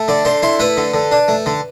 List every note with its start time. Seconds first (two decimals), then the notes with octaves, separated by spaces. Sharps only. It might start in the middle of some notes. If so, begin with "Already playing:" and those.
Already playing: A3
0.08 D3 D5
0.25 D3 C5
0.42 E4 C5
0.59 A3 B4
0.77 D3
0.94 D3
1.12 D4
1.28 A3
1.46 D3